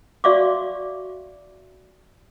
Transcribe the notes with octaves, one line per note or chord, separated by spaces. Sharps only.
F#4 D5 E5 F5 C#6 D6